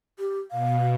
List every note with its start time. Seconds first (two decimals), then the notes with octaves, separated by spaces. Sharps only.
0.19 G4
0.51 B2 F5